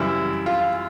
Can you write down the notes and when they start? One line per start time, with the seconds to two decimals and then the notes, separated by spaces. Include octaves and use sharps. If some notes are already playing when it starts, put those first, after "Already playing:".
Already playing: F#2 C#3 E3 G3 E4
0.46 F4